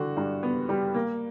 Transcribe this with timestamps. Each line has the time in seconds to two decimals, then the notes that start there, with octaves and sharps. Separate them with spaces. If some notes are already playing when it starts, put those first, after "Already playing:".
Already playing: D3 G3 F#4
0.17 G2
0.43 B3
0.69 G3
0.94 A#3